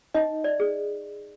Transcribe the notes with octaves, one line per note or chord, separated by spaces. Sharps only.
D#4 D#5
D5
G#4